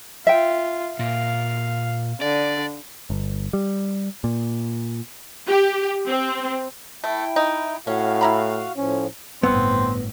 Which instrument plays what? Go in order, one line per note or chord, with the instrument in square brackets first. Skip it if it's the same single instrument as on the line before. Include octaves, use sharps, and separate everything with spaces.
[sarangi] F4 [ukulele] E5 G5
[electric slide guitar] A#2 [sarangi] F5
[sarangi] D3 [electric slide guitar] D5
[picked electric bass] G1
G3
A#2
[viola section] G4
C4
[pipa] A3 [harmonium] E4 G5
[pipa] D#4
[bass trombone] A2 [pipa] C#4 [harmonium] F#4 F5
[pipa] E4 A#5 B5
[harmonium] A2 F3 [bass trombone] C#4
[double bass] G1 A2 [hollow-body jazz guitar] B3 [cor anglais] C4